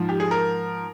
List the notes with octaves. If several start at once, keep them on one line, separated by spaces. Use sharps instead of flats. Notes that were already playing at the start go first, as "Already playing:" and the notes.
Already playing: G#2 F3
G4
G#4
A#4